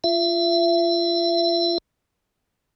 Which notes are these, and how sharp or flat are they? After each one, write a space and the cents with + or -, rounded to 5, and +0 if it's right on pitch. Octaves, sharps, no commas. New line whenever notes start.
F4 -25 E5 +30